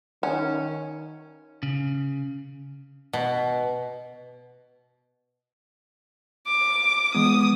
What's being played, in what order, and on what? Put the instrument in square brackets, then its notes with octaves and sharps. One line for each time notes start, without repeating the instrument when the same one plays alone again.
[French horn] D#3 [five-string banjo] C#4
[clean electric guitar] C#3
[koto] B2
[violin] D6
[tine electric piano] E3 G#3 B3 [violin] D#6